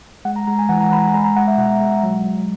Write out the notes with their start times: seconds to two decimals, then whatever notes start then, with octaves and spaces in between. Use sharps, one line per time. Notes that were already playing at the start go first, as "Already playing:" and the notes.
0.25 G#3 F#5
0.36 A#5
0.47 G#3 A#5
0.59 G#5
0.69 E3 F#5
0.80 A#5
0.91 E3 B5
1.03 A#5
1.14 G#3 A#5
1.24 A#5
1.36 G#3 F#5
1.47 E5
1.58 B2 F#5
1.80 G#3
2.03 F#3
2.25 F#3